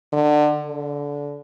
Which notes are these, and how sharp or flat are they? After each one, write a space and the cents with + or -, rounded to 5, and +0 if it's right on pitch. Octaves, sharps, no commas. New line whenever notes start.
D3 +25
D3 -25